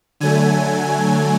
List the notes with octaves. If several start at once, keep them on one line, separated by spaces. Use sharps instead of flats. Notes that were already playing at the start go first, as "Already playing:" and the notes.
D3 F#3 A3 G#5